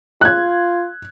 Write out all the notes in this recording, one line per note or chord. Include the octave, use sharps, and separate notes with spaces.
F4 F#6 G#6